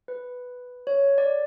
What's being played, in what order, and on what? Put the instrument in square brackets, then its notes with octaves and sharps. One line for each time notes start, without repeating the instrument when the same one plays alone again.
[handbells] B4
C#5
D5